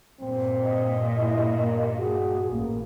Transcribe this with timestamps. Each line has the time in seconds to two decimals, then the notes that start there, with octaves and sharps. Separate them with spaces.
0.20 G2 A#2 C4
0.64 D#5
1.19 E4
1.62 A#3
1.98 F#4 G#4
2.52 A1 A#3